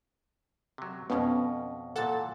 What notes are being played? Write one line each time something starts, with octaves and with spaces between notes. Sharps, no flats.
C3 F#3
F2 B2 B3 C#4
A#2 E3 A4 F#5 A6